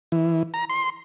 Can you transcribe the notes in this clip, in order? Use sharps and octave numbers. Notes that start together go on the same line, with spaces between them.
E3
A#5
C6